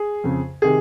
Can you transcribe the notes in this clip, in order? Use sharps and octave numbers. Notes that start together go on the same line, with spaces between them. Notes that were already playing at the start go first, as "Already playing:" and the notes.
Already playing: G#4
F2 C#3
C3 D#3 G#4